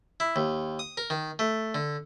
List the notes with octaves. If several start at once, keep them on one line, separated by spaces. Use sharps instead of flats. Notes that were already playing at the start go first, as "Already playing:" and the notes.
E4
D#2
D#6
A#4
D#3
A3
D3